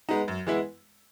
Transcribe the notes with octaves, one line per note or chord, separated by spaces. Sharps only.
G#3 B3 D#4
F#2
E3 G#3 B3 E4